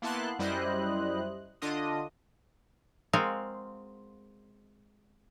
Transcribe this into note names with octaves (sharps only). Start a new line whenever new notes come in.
A#3 B3 E4 A5 C6 F#6
F#2 G3 E4 C5 D#5 F#6
D3 D4 F4 D#5 D#6
G#3 C4 F4 F#4 A#4 F5